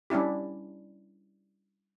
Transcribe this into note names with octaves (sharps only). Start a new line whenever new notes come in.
G3 C#4 D4 E4 G4